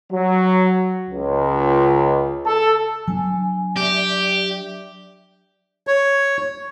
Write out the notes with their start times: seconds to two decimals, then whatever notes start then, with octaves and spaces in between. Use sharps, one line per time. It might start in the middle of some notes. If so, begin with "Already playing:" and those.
0.13 F#3
1.09 C#2
2.46 A4
3.08 F#3 C4 D4 G#5
3.77 G4 D5 E5
5.87 C#5